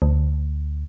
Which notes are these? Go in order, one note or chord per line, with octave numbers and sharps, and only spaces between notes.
D2